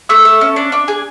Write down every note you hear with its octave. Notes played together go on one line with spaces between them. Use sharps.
A3 E6
A4
C#4
D4
D4
G#4